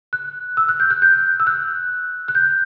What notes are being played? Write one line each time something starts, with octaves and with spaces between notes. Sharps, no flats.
F#6
E6
F#6
G6
F#6
G6
E6
F#6
F#6
G6